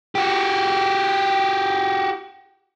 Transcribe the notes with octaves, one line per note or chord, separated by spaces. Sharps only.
F#4 G4